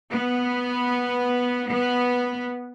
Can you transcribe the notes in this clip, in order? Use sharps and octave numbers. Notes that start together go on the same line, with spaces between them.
B3
B3